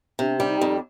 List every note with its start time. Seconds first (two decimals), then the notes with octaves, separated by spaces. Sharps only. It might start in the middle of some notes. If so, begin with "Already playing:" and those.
0.19 C3 D4
0.39 G3 D4
0.47 D#4
0.61 F2